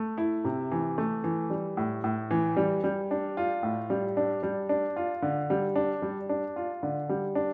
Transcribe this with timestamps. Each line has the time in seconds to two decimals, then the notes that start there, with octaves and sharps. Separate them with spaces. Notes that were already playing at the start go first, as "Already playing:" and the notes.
Already playing: A3
0.18 E4
0.45 C3
0.71 E3
0.98 A3
1.24 E3
1.50 G3
1.77 A2
2.04 A2
2.31 E3
2.57 G3
2.84 G3
3.11 D4
3.37 F4
3.63 A2
3.90 G3
4.17 D4
4.43 G3
4.69 D4
4.96 F4
5.22 D3
5.50 G3
5.76 D4
6.02 G3
6.29 D4
6.56 F4
6.83 D3
7.09 G3
7.35 D4